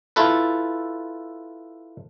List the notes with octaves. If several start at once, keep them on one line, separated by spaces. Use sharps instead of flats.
E4 F4 A4 B4